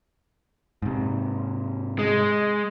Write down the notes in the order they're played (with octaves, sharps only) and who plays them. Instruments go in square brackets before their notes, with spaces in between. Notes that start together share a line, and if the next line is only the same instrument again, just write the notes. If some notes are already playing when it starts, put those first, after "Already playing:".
[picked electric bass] G#2 C3
[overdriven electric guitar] G#3